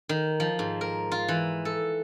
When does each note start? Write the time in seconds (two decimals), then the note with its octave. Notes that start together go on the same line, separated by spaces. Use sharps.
0.09 D#3
0.40 F3
0.59 G#2
0.81 A#4
1.12 F4
1.28 E3
1.65 A4